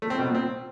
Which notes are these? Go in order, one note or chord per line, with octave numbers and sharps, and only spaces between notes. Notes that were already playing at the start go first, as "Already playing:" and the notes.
A3
C4
B2
A#2
C4